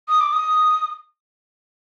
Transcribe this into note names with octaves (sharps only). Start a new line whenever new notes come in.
D#6
D6
D#6